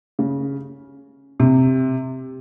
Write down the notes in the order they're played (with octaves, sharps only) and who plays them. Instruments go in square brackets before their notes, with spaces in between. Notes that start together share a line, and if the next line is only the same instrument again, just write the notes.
[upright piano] C#3
C3